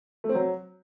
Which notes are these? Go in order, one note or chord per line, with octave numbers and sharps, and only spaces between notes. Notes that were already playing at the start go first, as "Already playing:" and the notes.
A3
C4
F#3